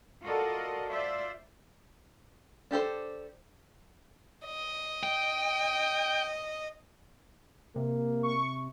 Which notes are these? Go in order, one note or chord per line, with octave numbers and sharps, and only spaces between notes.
F4 F#4 A4 A#4 D5 D#5
F4 C5 D5 E5
D4 G4 A4 C5
D#5
G5
C3 A#3
C#6